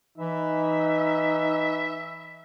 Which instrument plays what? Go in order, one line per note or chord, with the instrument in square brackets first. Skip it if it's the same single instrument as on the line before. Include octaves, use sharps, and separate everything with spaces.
[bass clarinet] E3 [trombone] D#4 [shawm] E5